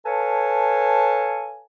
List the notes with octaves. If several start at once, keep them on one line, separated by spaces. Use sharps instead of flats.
A4 B4 C#5 F5 G#5 A5